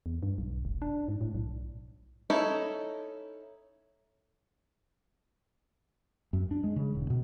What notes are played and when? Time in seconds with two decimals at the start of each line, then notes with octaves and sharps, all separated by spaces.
0.06 E2
0.23 G2
0.38 B1
0.65 F1
0.82 D4
1.08 G#2
1.21 A2
1.35 B1
2.30 C#4 D#4 E4 A4
6.33 F#2
6.51 D4
6.64 G#3
6.76 C#3
6.95 D#1
7.10 B2